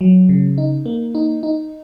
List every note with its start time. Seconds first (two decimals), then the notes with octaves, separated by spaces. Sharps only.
0.01 F#3
0.29 C#3
0.58 D#4
0.86 A#3
1.15 D#4
1.43 D#4